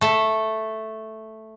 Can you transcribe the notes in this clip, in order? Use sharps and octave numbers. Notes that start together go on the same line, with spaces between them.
A3 A4